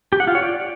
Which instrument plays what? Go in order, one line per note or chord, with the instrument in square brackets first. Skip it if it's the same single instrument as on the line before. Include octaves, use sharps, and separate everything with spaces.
[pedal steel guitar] G4
F#5
F4
C#5
D5